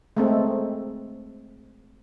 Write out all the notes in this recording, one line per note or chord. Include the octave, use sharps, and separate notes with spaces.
G#3 A3 C4